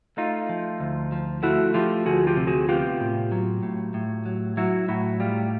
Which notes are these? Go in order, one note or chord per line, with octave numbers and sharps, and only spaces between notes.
A3 D#4 F4
F3
D2
F3
A3 E4 F#4
F3 F4 G4
D2 F#4 G#4
F4 G4
C3
F#4 G#4
B3 F4 G4
A2
F#3
A2
A2
F#3
F#3 E4 F#4
A2 E4 F#4
G3 F4 G4